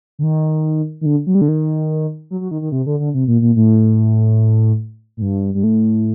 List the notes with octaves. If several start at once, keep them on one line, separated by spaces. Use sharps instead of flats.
D3
D#3
D#3
D3
F#3
G3
D3
D#3
F#3
F#3
D#3
D#3
C3
D3
D3
C3
A#2
A#2
A2
A2
G2
G2
A2